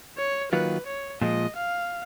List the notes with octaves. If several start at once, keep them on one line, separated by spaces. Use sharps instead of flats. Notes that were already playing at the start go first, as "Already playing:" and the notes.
C#5
D#3 F#3 A#3 F4 B4
C#5
A#2 F3 G#3 D#5
F5